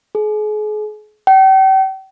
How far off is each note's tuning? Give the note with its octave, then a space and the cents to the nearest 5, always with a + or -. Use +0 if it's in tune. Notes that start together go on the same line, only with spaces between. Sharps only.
G#4 +35
G5 -40